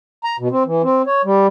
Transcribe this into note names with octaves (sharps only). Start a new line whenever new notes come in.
A#5
B2
C4
E3
C4
C#5
G3